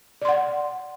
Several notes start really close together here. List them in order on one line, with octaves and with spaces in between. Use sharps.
D5 C6 F#5